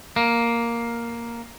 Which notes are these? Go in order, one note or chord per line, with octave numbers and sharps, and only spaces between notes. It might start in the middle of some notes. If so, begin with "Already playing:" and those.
A#3